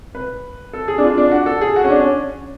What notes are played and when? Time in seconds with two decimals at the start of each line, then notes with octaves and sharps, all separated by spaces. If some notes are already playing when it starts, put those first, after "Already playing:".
0.15 B4
0.73 A4
0.88 G#4
0.98 D4
1.03 F4
1.18 D4
1.31 F#4
1.46 A4
1.61 G#4
1.76 F#4
1.84 C#4
1.90 D4
2.00 C#4